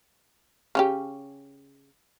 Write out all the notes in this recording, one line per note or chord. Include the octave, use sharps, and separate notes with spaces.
C#3 C#4 G4